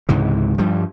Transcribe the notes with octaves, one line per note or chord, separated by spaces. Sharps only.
C#2 G#2 C3 E3
G2 F3 G3